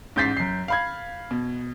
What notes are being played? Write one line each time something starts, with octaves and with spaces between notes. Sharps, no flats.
A1 G#2 G6 A6 B6 C7
F#2 C7
F5 B5 G#6
B2